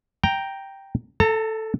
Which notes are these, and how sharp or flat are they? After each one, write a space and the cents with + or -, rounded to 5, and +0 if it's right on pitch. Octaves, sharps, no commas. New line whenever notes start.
G5 +0 A#5 +0
A4 +0 A#5 -45